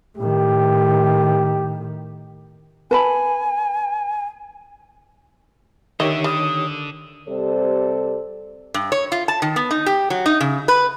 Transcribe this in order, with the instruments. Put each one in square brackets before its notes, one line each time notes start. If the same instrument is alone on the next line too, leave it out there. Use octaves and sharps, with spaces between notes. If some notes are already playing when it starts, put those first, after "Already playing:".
[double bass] A2 D#3 [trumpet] G4
[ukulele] B4 A5 B5 [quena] G#5
[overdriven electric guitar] D3 [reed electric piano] D#3 G4 C#5 [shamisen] D#5 [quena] E5
[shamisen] G3 [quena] D#6
[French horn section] C3 G3 A4 C5 D5
[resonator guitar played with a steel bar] G2
C#5
F4
A5
D#3
B3
D#4
G4
F#3
D#4
C#3
B4